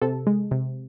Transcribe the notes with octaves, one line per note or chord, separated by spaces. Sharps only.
C3 A4
G#3
C3